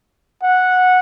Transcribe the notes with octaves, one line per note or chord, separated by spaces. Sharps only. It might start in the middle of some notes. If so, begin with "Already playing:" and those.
F#5